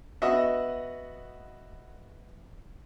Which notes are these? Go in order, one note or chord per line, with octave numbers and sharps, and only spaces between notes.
B3 F#4 D#5 E5